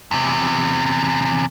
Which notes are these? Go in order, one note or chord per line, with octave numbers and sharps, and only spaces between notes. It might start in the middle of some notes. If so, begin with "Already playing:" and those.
E2 C3